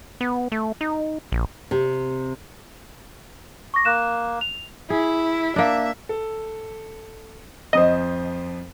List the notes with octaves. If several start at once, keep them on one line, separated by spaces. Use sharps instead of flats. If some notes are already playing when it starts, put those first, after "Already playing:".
B3
A3
D#4
A#1
C3
C#6 D6 A#6
A#3 F#6 E7
F7
E4 G#4
A#3 D4 E5
A4
F2 F3 C5 D#5